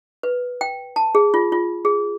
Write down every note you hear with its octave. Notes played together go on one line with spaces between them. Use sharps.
B4
G5
A5
G#4
F4
F4
G#4